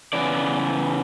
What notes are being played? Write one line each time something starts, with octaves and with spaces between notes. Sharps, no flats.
C#3 E3 B3 D5